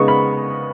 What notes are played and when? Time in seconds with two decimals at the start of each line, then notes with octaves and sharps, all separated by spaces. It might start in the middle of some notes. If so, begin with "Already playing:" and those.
Already playing: C#3 G#3 B3 D#4 C#6
0.08 B5